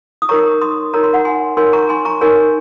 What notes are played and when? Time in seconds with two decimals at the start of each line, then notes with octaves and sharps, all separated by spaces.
0.22 D#6
0.29 D#4 A#4 C#5 A#5 C#6
0.61 C6 D#6
0.94 D#4 A#4 C#5 A#5
1.04 C6
1.13 F#5 A#5
1.25 G#5 C6
1.57 D#4 A#4 C#5 G#5 C6
1.73 A#5 C#6
1.89 G#5 C6
2.05 A#5 C#6
2.21 D#4 A#4 C#5 G#5 C6